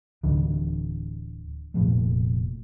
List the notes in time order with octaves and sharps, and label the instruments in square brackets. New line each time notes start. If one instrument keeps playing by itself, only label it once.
[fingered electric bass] D1 D3 E3 D4
F1 A#2 F3 A3